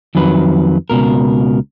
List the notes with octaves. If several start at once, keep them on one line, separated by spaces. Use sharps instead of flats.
F2 D#3 F#3 B4
C#2 F#2 B2 A#4